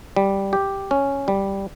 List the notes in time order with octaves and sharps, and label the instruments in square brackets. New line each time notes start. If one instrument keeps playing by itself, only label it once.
[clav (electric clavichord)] G3
G4
C#4
G3